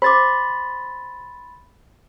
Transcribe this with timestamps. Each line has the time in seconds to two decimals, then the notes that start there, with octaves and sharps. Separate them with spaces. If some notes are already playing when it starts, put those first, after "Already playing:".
0.02 C5 B5 C6 D6 A6